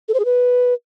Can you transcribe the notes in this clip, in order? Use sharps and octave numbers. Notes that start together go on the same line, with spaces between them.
A4
C5
G#4
B4